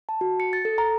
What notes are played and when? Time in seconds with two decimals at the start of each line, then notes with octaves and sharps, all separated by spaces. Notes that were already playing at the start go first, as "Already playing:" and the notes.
0.09 A5
0.21 F#4
0.40 C#7
0.53 A6
0.65 A4
0.78 A#5